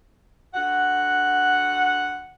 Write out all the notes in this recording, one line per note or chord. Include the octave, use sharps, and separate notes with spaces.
D3 F#4 F#5